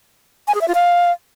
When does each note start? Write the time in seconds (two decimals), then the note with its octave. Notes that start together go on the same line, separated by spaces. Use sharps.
0.48 G#5
0.55 G#4
0.61 E5
0.68 F4
0.75 F5